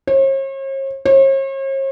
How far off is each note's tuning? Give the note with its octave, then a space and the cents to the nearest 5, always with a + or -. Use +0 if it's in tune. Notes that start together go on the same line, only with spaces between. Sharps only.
C#5 -45
C#5 -45